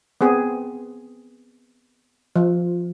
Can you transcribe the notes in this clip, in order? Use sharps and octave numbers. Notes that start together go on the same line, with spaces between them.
B3 C4 G#4
F3